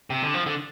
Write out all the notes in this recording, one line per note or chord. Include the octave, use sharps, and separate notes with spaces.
C3
D3
F3
D3